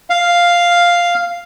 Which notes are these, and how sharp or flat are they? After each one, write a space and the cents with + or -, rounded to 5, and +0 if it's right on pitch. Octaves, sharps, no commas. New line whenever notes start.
F5 +0